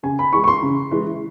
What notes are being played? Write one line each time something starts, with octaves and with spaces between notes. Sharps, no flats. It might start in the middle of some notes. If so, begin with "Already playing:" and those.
C#3 G#5
B5
E3 G#3 C#6
C#6
C6
C#3
E3 G#3